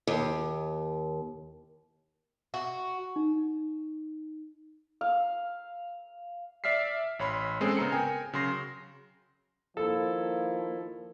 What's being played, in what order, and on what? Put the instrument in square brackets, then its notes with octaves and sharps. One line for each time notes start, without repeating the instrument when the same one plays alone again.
[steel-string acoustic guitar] D#2
[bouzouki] F#4
[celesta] D#4
[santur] F5
[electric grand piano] D5 E5 F6 B6 C7
A1 C#5 B5 C6
G#3 C4 C#4 G#4 A4
C#3 B3 A#5 C#7
A#4 G5 G#5
C#3 F#3 C6 A#6
[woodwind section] D#3 E4 [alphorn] F3 [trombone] A#3 [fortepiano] A4